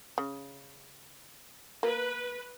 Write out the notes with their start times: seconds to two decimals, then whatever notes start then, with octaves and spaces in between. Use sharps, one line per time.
0.18 C#3
1.83 A#3 B4